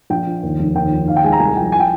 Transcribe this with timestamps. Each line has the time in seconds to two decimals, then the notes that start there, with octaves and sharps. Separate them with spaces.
0.10 A#1 G5
0.27 F3
0.43 D#2
0.60 F1
0.75 D#2 G5
0.91 F3
1.08 D#2 F5
1.16 G5
1.24 G#3 G#5
1.32 A#5
1.40 C2 G#5
1.56 F3 G5
1.72 G#5
1.80 G5